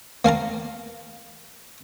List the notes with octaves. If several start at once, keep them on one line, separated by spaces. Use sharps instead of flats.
A#3 F5 A5 A#5